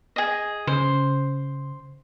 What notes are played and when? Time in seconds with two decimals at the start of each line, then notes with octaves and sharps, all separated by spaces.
0.16 G#4 D#5
0.67 C#3 C5